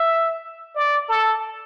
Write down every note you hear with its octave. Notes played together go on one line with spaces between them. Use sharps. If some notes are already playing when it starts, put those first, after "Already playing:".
Already playing: E5
D5
A4